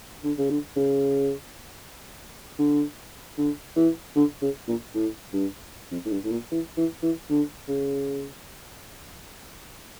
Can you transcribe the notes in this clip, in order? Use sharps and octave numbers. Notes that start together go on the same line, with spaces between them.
D3
C#3
D3
C#3
D3
D3
E3
D3
C#3
A#2
A2
G2
F2
A2
G2
A2
A#2
E3
E3
E3
D3
C#3